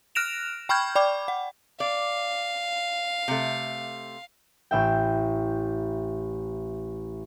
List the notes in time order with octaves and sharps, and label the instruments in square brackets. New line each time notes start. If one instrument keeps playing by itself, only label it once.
[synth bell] F6 F#6 A#6 D7 E7 F7
G5 B5 C#6 F6 G6 G#6
D5 G5 B5 D6
F#5
[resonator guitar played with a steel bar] D5 [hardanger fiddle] F5
[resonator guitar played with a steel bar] C3 A3
[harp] A1 E5 G5